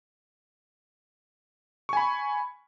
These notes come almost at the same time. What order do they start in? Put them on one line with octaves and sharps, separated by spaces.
C#6 G#5 B5